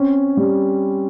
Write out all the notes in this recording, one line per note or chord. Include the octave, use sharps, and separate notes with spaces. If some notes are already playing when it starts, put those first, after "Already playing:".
Already playing: C4 C#4
G3